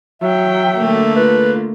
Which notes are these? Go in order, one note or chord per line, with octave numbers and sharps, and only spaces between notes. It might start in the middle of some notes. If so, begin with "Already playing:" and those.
F#3 E5 G5
D3 A3 A#3
F4 B4